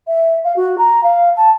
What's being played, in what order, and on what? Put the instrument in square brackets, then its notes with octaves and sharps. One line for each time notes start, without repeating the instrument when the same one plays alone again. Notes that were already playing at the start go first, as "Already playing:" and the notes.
[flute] E5
F5
F#4
A#5
F5
A5